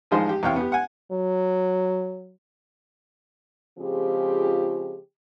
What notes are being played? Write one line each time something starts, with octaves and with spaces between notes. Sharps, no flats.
A1 D#3 F3 G#3 D#4 C5
G4
E2 C3 C#5 F5 G5
B3 G4
F#5 G#5
F#3
C#3 F3 G#3 C4 F4 G4